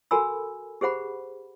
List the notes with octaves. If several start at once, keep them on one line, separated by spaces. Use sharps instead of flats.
F#4 A4 A#4 G#5 B5 E6
G4 G#4 C5 F#5 B5